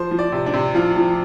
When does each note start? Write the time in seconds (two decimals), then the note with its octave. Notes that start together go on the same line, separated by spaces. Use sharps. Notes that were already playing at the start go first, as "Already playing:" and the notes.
Already playing: F3 C5
0.11 F3
0.19 D5
0.32 C3
0.46 D4
0.53 C3
0.75 F3 F4
0.96 F3